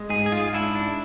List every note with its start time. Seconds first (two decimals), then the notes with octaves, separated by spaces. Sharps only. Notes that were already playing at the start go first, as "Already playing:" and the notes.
Already playing: G#3
0.10 G#2 G#4
0.26 G#4
0.32 G#2 F4
0.53 D4 E4
0.75 D4